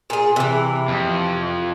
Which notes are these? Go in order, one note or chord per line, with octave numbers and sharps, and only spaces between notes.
A#2 G#4
C3 E3
F2